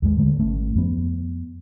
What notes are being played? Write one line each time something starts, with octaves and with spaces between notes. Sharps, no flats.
D#2 G#2 G#3
D3 G#3 A3
G#1 A3 C#4
F2 F3 B3